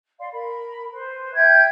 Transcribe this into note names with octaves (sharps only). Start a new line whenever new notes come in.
D5 F5 C6
A#4 B5
B4 C5 C6
E5 G5 G6 G#6